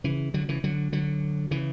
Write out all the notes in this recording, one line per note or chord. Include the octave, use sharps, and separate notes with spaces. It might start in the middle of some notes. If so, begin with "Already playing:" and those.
C#3 E3
D3 F#3
C#3 E3
D3 F#3
D3 F#3
C#3 E3